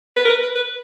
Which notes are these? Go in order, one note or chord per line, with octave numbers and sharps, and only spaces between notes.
B4
A#4
B4
B4
B4